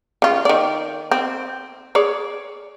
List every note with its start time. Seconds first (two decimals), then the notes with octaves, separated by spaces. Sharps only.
0.22 C#3 F4
0.45 D#3 D5
1.11 C4
1.95 G#4 C#5 D5